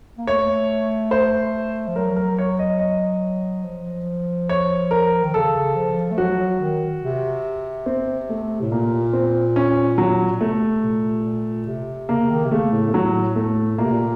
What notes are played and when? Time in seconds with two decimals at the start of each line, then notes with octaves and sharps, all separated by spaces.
0.18 A#3
0.27 A3 C#5
1.11 C5
1.87 F3
1.96 F#3 A#4
2.16 A#4
2.38 C#5
2.59 D#5
2.80 D#5
3.64 F3
4.49 C#5
4.91 A#4
5.23 D#3
5.34 C#3 A4
5.75 F3
6.11 A3
6.18 F#3 F#4
6.39 F#3
6.60 D#3
7.02 C3
7.86 C4
8.30 A3
8.61 A2
8.71 A#2 A#3
9.13 C4
9.56 C#4
9.98 F#3
10.32 A#2
10.41 C3 A3
10.83 A#2
11.24 A#2
11.66 C3
12.09 C#3 A#3
12.30 D#3
12.45 C3
12.51 C#3 A3
12.72 A2
12.88 A3
12.94 A2 F#3
13.36 A3
13.78 A#2 A#3
13.85 C3
13.92 A#2